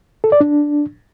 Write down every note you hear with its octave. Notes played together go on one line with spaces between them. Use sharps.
A4
D5
D4